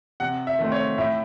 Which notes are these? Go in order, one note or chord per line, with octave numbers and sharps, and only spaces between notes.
C3 F#5
E5
D#3 A3 C4
C#5
A2 E5